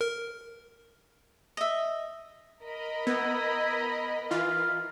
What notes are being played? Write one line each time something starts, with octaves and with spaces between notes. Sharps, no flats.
A#4
D#5 E5
A#4 D#5 B5
B3 E4
E3 F4 F5